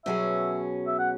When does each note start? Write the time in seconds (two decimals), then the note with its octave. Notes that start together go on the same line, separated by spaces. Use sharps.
0.05 B2 F#3 C#4 G#4 E5
0.87 E5
0.99 F#5